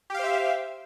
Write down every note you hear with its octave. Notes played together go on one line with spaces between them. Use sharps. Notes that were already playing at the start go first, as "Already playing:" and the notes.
G4 C5 E5 F5